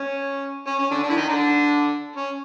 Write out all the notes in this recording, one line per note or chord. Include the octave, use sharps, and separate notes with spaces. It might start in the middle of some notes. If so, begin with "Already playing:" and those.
Already playing: C#4
C#4
C#4
D3 D4
D3 D4
E4
D#3 D#4
D3 D4
C#4